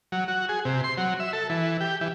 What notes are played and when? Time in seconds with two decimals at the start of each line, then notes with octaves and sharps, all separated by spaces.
0.12 F#3
0.28 F#4
0.49 G#4
0.65 C3
0.84 C6
0.98 F#3
1.20 E5
1.33 A4
1.50 E3
1.81 G4
2.01 E3